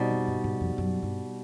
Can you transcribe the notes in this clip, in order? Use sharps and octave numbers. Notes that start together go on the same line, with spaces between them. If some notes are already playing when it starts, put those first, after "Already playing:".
Already playing: B2 G3 C4 D#4
F2
G2
G#2
F2
F#2
G2